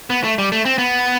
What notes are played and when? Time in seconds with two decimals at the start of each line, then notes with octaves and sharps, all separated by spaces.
0.10 B3
0.24 A3
0.38 G3
0.52 A3
0.65 C4
0.78 B3